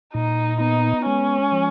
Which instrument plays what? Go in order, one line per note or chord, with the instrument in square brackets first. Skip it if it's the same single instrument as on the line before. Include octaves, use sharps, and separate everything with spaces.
[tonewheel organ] A#2 [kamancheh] D#4
[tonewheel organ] B3 [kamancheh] D#4
[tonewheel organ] G#3 [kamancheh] C#4
[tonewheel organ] F3